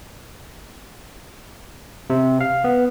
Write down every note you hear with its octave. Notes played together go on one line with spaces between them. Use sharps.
C3
F5
B3